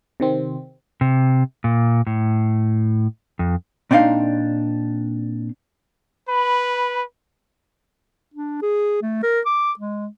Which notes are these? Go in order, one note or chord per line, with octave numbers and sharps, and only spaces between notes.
C3 D#3 C4
C3
A#2
A2
F2
A#2 C4 D4 D#4 F5
B4 B5
D4
G#4
A3
A#4
D6
G#3